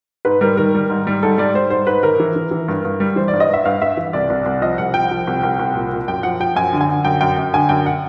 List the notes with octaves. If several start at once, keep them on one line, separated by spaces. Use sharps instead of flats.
G#2 B4
G3 A#4
D#3 A#4
G3
G#2
G3
G#2 A4
G3 D5
G3 C5
G#2 C5
G#2 B4
D#3 A#4
E3
E3
E3
G2
G2
G3
E3 C5
D5
G2
D#5
G2 E5
G2 F5
G2 E5
E3
C2 D5
C2
C2
F3 D#5
C2 F#5
F3 G5
F3
C2
C2
C2
A#2
A#2
F#2 G5
F3 F#5
F3 G5
F#2 G#5
D3
G#5
D3
F#2 G5
F#2 G5
F#2 G5
D3 G#5
F#2 G5
F#5